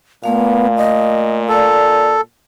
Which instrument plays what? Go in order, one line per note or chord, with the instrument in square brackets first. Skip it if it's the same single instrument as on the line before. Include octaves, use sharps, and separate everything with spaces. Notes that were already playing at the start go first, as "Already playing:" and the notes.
[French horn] A#2 [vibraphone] A3 F5 [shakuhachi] B3
[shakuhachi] D#5
[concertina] A4 [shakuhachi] D5